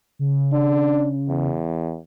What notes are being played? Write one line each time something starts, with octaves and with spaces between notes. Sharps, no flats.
C#3
D4
E2